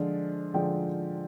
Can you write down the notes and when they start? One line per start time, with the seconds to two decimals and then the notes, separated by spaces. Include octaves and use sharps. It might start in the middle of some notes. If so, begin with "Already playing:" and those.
Already playing: D3 F3 G#3 D4 F4
0.54 D3 F3 G#3 D4 F4 G5